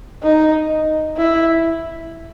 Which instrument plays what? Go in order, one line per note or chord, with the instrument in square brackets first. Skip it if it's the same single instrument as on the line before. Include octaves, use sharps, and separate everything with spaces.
[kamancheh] D#4
E4